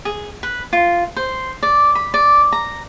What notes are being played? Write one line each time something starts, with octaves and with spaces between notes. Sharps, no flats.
G#4
B4
F4
C5
D5
B5
D5
A#5